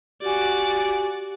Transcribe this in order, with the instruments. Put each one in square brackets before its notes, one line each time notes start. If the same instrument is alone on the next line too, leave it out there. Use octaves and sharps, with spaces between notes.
[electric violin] F#4 D5 [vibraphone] G4 G#5